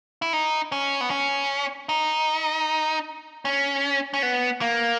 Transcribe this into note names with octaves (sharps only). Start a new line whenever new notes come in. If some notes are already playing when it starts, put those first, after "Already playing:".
E4
D#4
C#4
B3
C#4
D#4
C#4
C#4
B3
A#3